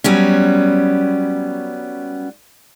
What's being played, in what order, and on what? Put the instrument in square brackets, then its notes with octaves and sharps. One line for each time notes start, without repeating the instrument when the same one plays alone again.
[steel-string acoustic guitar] F#3 G3 B3 C#4